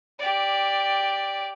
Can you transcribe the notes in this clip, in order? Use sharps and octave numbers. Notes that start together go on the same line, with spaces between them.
G4 D5